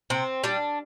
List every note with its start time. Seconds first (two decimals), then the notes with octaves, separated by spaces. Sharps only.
0.10 C3 C4
0.44 G3 D4